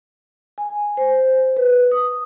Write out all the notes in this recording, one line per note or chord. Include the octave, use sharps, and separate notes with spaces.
G#5
C5
B4
D#6